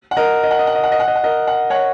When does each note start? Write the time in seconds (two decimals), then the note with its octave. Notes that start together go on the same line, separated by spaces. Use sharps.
0.11 F#5
0.17 A#4 D#5
0.43 D#5
0.51 F#5
0.59 D#5
0.67 F#5
0.75 D#5
0.83 F#5
0.92 D#5
1.00 F#5
1.08 D#5
1.16 F#5
1.24 A#4 D#5
1.47 F#5
1.70 C#5 F#5